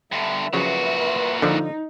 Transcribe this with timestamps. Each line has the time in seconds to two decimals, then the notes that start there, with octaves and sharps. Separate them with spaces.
0.12 G2 D3 E5
0.53 A#2 C#3 F3 F#3 F#4 B4 E5
1.42 D3 F3 D#4